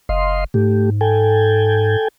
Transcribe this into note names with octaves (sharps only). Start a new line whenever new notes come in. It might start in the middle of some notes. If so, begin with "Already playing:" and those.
F#1 D#5 F5 C6
G#2 A3 G4
A4 G5 G#5